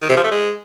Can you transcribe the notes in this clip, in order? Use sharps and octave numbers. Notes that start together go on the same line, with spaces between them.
D#3
C3
F3
A3
G#3